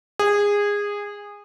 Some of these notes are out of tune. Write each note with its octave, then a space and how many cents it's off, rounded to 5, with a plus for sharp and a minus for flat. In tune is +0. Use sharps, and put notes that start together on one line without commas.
G#4 -20